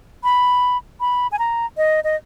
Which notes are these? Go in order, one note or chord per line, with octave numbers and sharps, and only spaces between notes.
B5
B5
G#5
A#5
D#5
D#5